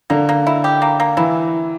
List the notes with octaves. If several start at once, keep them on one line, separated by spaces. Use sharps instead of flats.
D3 A#3
A#3
E4
G4
A#3
A#3
E3 E4